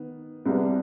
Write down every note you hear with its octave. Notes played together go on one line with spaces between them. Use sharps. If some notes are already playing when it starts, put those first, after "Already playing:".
Already playing: D#3 B3
C2 C3 G3 B3